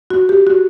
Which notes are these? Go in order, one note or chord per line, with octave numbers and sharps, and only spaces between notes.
F#4
G4
F#4